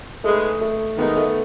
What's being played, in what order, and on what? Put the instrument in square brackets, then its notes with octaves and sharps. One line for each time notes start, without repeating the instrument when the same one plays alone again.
[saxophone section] G#3 D#4 G#4 B4 [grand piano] A3
[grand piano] A3
[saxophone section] D#3 G#3 D#4 [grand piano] B3
[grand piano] A3